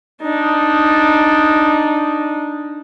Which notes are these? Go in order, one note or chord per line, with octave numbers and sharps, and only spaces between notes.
D4 D#4